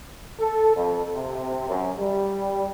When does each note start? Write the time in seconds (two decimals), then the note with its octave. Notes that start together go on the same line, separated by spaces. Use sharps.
0.40 A4
0.76 F2
1.15 C3
1.68 F#2
1.99 G3